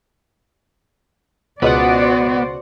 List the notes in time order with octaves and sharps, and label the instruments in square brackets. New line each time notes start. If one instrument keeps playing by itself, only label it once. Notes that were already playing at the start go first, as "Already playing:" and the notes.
[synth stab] C#2 B2 F#5 [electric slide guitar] B3 [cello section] F#4 C5 D5